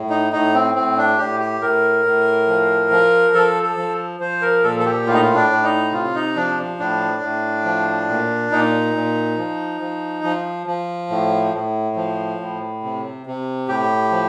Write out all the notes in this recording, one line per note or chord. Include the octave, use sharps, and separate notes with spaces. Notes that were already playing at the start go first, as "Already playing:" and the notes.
Already playing: A2
D#4
A2 D#4
C4
A2 C4
D4
A2 G4
G4
A2 A#4
A2
F3
F3
F3 A4
A4
F3
F3 C5
A#4
A#2 A4
A4
G4
A2 F4
D#4
F4
D4
A2
D#4
C3 F4
D#4
F3 D4
A2 D4
A2
F3
A#2
A#2 D#4
A#2
F3
F3
F3
F3
A2
A2
F3
A2
C3
C3
A2 G4
F3